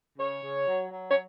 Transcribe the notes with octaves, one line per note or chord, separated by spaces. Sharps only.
C#3 C#5
C#3
F#3
F#3
C#5